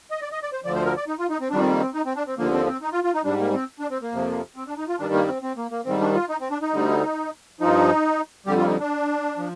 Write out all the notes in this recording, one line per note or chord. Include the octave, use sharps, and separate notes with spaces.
D#5
D5
D#5
D5
C5
D2 D3 F3 D5
C5
A#4
D5
D#4
F4
D#4
C4
F2 D#3 G3 D4
C4
A#3
C4
D#4
C4
D4
C4
D#2 D3 F3 A#3
C4
C4
D#4
F4
F4
D#4
G#2 G3 D4
A#3
C4
D4
C4
A#3
F2 C3 F3
C4
D4
D#4
F4
G2 D#3 G3 D4
A#3
C4
C4
A#3
A#3
G#2 D#3 G3 C4
D4
F4
D#4
C4
D4
D#4
D2 D3 G3
G2 F3 D#4
F2 D3 G3 G4
F4
D#4
D4
F3